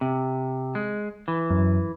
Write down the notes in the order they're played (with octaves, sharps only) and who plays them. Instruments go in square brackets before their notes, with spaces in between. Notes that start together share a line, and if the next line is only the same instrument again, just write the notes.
[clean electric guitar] C3
G#3
E3
[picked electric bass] F#2